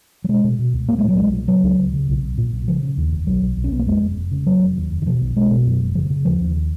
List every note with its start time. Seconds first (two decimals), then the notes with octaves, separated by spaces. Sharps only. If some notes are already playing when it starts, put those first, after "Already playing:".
0.24 F#3
0.29 B2 G#3
0.44 B2
0.59 B2
0.74 C#2
0.88 A#2 A#3
0.99 G#3
1.04 A#2 F#3
1.18 B1 G#3
1.33 A#2
1.48 C#3 F#3
1.63 C#2
1.78 C#3
1.93 C#3
2.08 B1
2.23 B1
2.38 A#2
2.52 B1
2.67 C#3 F3
2.83 C#3
2.97 D#2
3.12 F1
3.27 B1 F#3
3.42 B1
3.57 B1
3.64 C#4
3.72 B1 B3
3.79 A#3
3.87 F2 G#3
4.02 F1
4.17 F1
4.31 C#3
4.46 F1 F#3
4.61 F1
4.77 D#2
4.91 F1
5.02 D#3
5.06 B2 F3
5.21 B1
5.36 B1 G#3
5.51 B2
5.66 F#2
5.81 F#1
5.95 C#3 F3
6.10 C#3
6.25 D#2 F3
6.40 D#2